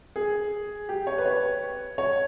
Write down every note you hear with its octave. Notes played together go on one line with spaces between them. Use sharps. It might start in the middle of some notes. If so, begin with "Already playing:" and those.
G#4
G4
C#5
B4
C#5
C#5